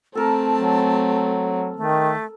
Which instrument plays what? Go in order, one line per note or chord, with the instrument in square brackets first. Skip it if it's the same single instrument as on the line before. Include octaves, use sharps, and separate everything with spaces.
[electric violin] A3 C4 [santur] A4 A#4 [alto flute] A5
[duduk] F#3
[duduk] D#3 [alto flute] A3